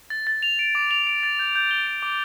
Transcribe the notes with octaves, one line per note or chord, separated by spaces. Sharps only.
A6
A6
F7
D7
D6
F7
D7
A6
G6
G6
G7
D7
D6